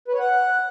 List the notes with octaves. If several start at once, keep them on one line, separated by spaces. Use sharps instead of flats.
B4
C#5
F#5